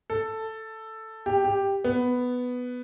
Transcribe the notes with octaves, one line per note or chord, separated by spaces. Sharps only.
A4
G4
G4
B3